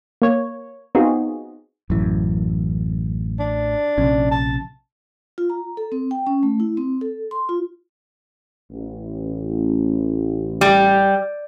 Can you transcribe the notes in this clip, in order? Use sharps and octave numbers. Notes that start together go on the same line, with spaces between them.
A#3 C#5
B3 C4 D#4 F4 F#4 G#4
A1 F#2 E3
D4
A#1 C3 C#4
A5
F4
A#5
A4
C4
G5
C#4
A3
E4
C4
A4
C6
F4
A1
G3